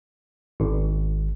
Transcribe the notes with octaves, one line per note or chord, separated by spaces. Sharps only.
G#1